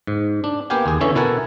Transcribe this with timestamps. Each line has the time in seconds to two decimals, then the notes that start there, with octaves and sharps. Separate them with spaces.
0.07 G#2
0.44 D4
0.70 A#3 B3 G4 F5 G5 G#5
0.86 D#2 G#4
1.01 D3 E3 C#4 C#5 E5
1.15 B2 E4 A4 A#4 F#5 G#5